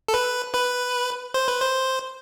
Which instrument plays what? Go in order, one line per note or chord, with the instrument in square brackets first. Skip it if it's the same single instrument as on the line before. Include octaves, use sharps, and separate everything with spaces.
[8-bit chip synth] A4
B4
B4
C5
B4
C5